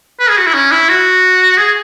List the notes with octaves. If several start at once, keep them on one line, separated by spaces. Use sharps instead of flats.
B4
G#4
F#4
E4
C#4
E4
F#4
G#4